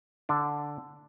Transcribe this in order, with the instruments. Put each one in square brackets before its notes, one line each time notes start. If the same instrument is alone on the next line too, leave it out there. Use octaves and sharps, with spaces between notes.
[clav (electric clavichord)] D3 D4